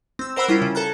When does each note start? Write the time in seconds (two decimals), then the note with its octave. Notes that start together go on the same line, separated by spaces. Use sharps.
0.19 C4 E6
0.36 A#4 C5 F#5 B5 E6 F#6
0.49 G3 C#4 E4 F4
0.62 C#3
0.75 A4 A5 A#5 F#6 G#6